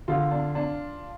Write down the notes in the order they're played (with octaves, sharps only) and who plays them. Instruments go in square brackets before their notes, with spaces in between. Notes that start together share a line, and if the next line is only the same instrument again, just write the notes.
[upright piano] D3 F4
D4
D4